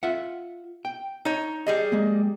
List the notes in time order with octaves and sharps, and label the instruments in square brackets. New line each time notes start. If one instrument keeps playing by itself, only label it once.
[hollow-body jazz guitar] F4 E5 F#5
G5
[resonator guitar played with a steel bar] D#4 C#5
G3 G#4 D#5
[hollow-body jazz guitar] G#3 A#3